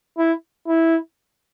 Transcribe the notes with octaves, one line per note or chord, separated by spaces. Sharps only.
E4
E4